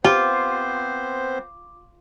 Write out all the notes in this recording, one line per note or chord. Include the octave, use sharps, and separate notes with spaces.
B3 C4 F4 G4 C5 D6